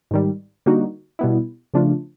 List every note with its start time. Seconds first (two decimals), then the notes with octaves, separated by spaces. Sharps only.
0.11 G#2 D#3 G3
0.66 D3 G3 A#3 D#4 F#4
1.19 B2 G3 B3 E4
1.74 C#3 F3 A3 D4 F4